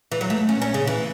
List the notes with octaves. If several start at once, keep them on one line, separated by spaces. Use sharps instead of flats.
E3
F#3
A3
C#4
C#4
C#3
E3